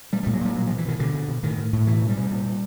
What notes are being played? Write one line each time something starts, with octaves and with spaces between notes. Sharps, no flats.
A#2 G3
G3
A#2
F#3
A#2 G3
B2 F#3
F3
B2
E3
B2 D#3
B2 D3
B2
B2
A2 D#3
A2
A2
B2 E3
B2
G3
B2
A#2
A#2